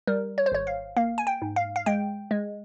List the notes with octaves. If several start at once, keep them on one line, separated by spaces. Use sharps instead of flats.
G3 A#4
C#5
C5
G#1 C#5
F5
A#3 F5
G#5
G5
G#2
F5
F5
G#3 G5
G#3